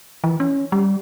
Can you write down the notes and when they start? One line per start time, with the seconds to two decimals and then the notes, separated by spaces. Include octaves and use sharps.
0.24 E3
0.40 C#4
0.72 G3